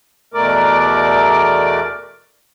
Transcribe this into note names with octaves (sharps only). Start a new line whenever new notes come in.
E2 B2 A3 A#4 D5 D6